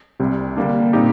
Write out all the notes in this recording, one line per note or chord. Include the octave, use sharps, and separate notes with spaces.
C2 C3 G3
D3 G3 A#3 D4
A#2 G3 C4 D#4 G4